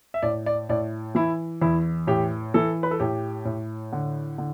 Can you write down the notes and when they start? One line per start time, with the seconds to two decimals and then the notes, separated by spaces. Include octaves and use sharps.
0.14 E5
0.23 A2 D5
0.46 D5
0.69 A2 D5
1.15 E3 E4
1.62 E2 E4
2.07 A2 G4
2.54 E3 A4
2.83 B4
2.91 A4
3.00 A2 G4
3.45 A2
3.92 D3
4.38 D3